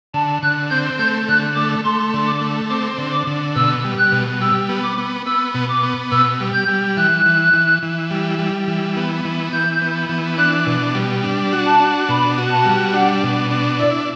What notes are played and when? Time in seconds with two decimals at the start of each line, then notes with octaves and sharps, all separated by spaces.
0.14 D3 A5
0.43 D3 F#6
0.70 C4 G6
0.99 A3 G6
1.28 D3 F#6
1.56 A3 D6
1.85 A3 C6
2.14 D3
2.27 D6
2.41 A3
2.69 C4 D6
2.98 D3
3.12 D6
3.27 D3
3.56 B2 E6
3.84 G3
3.98 F#6
4.12 B2
4.41 G3 E6
4.69 B3
4.84 D6
4.98 B3
5.26 B3 E6
5.54 B2
5.69 D6
5.83 B3
6.11 B2 E6
6.40 G3
6.54 G6
6.68 G3
6.97 E3 F#6
7.26 E3
7.54 E3
7.83 E3
8.11 G3
8.39 G3
8.68 E3
8.96 B3
9.25 E3
9.53 E3 G6
9.82 B3
10.09 E3
10.38 D4 F#6
10.67 B2
10.95 G3
11.24 D4
11.53 F#4
11.66 A5
11.80 D4
12.09 B2 B5
12.38 F#4
12.51 A5
12.66 G3
12.94 D4 F#5
13.23 B2
13.51 D4
13.80 E4 D5